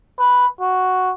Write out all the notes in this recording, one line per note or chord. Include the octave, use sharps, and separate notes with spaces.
B4
F#4